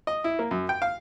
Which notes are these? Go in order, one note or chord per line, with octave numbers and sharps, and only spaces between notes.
D#5
E4
A#3
F#2
G5
F5